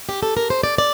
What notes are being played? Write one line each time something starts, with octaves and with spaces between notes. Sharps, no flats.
G4
A4
A#4
C5
D5
D5